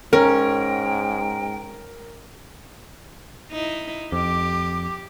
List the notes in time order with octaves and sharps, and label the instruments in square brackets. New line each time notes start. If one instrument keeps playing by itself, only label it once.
[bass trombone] G#2 [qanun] C#4 [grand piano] A#4 [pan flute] G5
[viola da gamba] D#4 E4
[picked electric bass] F2 [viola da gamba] G4 [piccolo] D6